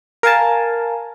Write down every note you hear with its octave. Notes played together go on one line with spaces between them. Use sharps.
A#4 F5 G#5 A5